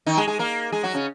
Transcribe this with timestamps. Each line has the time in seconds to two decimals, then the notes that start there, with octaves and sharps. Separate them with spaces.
0.06 D#3 D#4
0.17 G#3 G#4
0.28 G#3 G#4
0.39 A#3 A#4
0.72 G#3 G#4
0.83 F#3 F#4
0.94 C#3 C#4